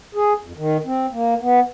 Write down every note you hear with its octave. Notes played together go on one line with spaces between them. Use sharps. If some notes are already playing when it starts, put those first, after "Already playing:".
G#4
F2
D#3
C4
A#3
B3